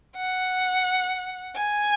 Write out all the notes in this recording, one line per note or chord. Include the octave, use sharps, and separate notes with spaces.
F#5
G#5